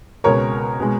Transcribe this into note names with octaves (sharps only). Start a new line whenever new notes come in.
C#2 B2 G#3 A#4 C#5
B2 G#3